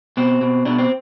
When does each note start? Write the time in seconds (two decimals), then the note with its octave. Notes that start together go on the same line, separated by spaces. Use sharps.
0.17 B2 C4
0.41 B2
0.65 B2 D4
0.78 C4